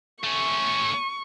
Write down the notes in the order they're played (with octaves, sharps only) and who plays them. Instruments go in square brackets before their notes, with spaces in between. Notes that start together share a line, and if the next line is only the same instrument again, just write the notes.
[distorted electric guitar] A3 C#4 [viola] C#6